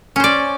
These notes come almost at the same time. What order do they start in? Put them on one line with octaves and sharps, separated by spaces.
C#4 C5 D5